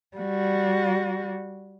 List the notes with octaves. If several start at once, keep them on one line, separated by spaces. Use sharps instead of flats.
G3 F#4